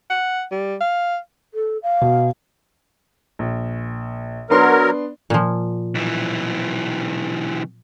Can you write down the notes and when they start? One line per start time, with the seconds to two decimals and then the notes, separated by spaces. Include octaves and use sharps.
0.10 F#5
0.52 G3
0.81 F5
1.54 A4
1.82 F5
2.01 B2
3.39 A#1
4.50 F#3 B3 D4 A#4 C6
5.30 A#2 F3
5.95 B1 E3